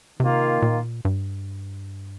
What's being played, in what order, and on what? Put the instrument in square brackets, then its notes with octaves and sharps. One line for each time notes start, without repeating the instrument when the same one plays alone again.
[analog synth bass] C3 [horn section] D#3 A#3 F4
[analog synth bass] A#2
G2